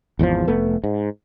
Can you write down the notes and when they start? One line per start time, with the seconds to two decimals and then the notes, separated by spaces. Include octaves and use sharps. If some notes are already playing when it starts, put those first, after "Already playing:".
0.19 G#1 E2 D#3 F3
0.47 F1 A3 B3
0.84 G#2